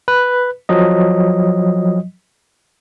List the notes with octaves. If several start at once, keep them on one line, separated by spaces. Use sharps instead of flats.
B4
F3 F#3 D#5